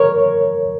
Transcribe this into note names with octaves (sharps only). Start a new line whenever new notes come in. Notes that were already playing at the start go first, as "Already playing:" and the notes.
Already playing: A#4 C#5